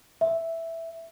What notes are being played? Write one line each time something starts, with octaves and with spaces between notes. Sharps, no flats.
E5